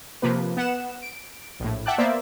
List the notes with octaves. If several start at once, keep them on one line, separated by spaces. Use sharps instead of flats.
C3 F3 A#3 B4
B3 F#5 E7
D7
A#1 A2
E5 F#5 G5 A5 D6 F#6
A#3 B3 C5 D5 E5